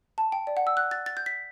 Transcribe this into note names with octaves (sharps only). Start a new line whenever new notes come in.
A5
G5
D5
F#5
E6
F#6
A6
A6
G6
B6